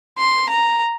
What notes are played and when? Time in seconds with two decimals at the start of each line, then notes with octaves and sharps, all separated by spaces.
0.18 C6
0.49 A#5